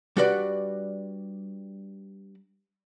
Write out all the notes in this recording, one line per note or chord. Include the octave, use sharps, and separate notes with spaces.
G3 D4 F#4 B4 D5 F#5